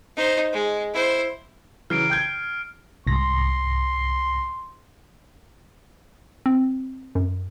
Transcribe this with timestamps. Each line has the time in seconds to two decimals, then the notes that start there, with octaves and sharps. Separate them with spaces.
0.16 D#4 C5
0.52 G#3
0.93 E4 C5
1.90 C#3 E3 F#3 F6 C7 D7
2.10 G5 G6 G#6
3.07 C2 G#2 C6 A#6
6.46 C4
7.15 F#2